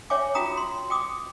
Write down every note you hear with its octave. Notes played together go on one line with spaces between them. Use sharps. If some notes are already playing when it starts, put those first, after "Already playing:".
C#5 E5 G5 G#5 D6
F4 F#4 G5 A#5 D#6
C6
G5 D6 D#6